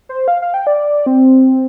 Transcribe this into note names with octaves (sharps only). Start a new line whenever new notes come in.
C5
F5
F5
G5
D5
C4